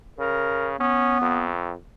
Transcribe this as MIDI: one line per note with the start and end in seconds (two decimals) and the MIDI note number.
0.19 0.76 49
0.19 0.70 70
0.80 1.50 59
0.80 1.20 61
1.22 1.75 41